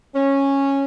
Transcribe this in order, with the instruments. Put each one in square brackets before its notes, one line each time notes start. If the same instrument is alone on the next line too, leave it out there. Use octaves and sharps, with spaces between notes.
[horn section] C#4